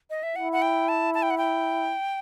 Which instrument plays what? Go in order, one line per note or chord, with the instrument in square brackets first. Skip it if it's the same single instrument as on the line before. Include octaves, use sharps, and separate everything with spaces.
[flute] D#5
E5
[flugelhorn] E4 [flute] F#5
[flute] F#5
G5
A5
A5
G5
F#5
G5